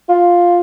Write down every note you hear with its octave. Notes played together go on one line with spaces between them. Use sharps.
F4